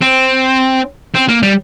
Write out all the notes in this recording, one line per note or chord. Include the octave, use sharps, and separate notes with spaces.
C4
C4
A#3
G3